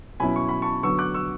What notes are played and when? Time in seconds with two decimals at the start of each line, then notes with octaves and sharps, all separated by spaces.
0.20 B2 F#3 C#4 E4 G#5 B5
0.36 C#6
0.49 B5
0.62 A5 C#6
0.83 D3 F#3 B3 C#6 E6
0.99 D6 F#6
1.14 C#6 E6